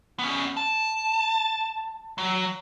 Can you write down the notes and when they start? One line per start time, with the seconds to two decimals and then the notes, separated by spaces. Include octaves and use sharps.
0.19 B3 C#4
0.57 A5
2.18 F#3